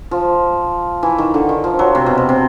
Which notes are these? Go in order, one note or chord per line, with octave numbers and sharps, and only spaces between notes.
F3
E3
D#3
D3
D#3
F3
F#3
C3
B2
C3
C3